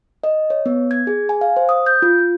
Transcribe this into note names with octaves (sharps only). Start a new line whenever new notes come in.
D#5
C#5
B3
G#6
G#4
G#5
F5
C5
D#6
G6
F4
F4